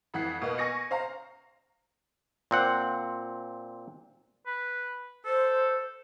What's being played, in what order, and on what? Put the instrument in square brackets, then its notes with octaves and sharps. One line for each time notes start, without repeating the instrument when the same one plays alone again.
[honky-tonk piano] F2 E3 F#5 B6 C7
B2 A#3 B3
G#5 C#6 A#6 C#7
C5 F5 A#5
[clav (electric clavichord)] A#2 C4 F#5
[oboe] B4
[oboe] A4 [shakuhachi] C5